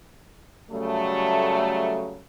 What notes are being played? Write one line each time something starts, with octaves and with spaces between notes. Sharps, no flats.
C#3 F#3 G3 A3